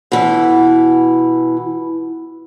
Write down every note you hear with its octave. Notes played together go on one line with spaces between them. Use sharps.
B2 E3